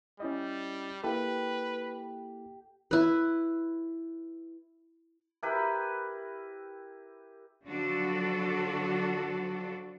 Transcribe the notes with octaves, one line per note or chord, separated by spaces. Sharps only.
G3 C#4 E4 D#5
A#3 E4 G4 A4 B4
E4 B4
E4 G4 A#4 B4
D3 F3 F#3 D4 F#4 A4